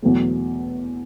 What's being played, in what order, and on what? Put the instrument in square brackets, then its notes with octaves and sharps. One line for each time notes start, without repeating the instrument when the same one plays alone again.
[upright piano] E2 B2 F#3 A3